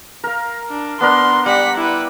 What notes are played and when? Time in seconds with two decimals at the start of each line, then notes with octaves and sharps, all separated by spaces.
0.24 A#4 F5
0.70 D4
1.01 B3 D4 A#4 C6
1.46 G3 F#5 B6
1.77 E4 B4